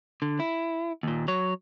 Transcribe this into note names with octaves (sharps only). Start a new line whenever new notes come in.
D3
E4
D#2 A#2
F#3 C#5